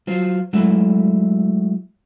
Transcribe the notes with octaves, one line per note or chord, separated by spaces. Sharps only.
F#3 F4 C5
F#3 G#3 A3 E4